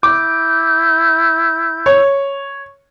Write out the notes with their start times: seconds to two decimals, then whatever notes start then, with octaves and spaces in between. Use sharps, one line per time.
0.03 E4 D6 G6
1.86 C#5